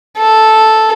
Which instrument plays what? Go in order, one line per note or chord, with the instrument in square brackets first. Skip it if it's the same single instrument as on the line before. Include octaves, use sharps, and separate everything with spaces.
[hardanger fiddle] A4